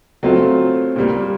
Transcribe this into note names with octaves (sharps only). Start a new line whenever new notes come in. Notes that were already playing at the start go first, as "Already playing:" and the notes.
F#3 A3 C4 F4
A#2 G3 A#3